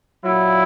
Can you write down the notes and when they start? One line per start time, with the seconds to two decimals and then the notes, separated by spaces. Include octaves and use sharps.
0.23 A#2 F#3 E4